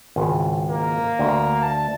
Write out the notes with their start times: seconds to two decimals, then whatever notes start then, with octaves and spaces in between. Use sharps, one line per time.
0.16 G#1 C#2
0.68 A#3
1.19 D2
1.62 A5